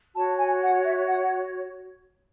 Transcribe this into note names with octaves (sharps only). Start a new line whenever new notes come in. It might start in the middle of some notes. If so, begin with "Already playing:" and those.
F#4 C#5 A5
G#5
F#5
E5
F#5